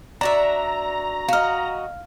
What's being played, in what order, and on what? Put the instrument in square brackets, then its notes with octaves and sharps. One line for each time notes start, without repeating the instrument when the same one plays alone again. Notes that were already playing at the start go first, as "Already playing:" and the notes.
[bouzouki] D4 F#4 E5 [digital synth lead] A#5
[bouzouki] F#4 D#5 [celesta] F5 F6